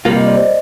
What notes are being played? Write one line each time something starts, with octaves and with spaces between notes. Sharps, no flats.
C3 G3 A#3 F4
D#5
D5
C5 D#5